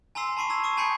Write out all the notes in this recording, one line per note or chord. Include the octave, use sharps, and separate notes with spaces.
G#5 A#5 C6 E6 C7
A5 B5 C#6 C7 D#7
A5 A#5 E6 G#6
C#6 D#6 E6
G#5 A5 B5 G6 C7 C#7